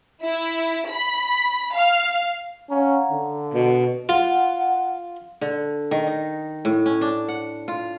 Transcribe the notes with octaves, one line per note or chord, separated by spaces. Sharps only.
E4
B5
F5
C#4 F5 F#5 A#5
D3
B2 B4
F4 F#5
D3
D#3
D#4
A2
C#4
D4
F#5
F4